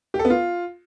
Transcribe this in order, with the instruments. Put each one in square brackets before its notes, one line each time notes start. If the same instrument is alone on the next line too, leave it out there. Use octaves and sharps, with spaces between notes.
[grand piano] G4
A4
B3
F4